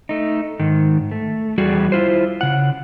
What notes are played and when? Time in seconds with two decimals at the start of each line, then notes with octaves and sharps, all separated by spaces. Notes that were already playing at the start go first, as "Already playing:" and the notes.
0.09 A3 D#4
0.59 G#2 D#3
1.11 A3
1.58 E2 G3 F#4 G#4
1.92 E4 F4 C5
2.41 C#3 F#5